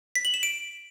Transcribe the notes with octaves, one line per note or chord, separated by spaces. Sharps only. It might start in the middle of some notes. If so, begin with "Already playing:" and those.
B6
F#7
E7
D7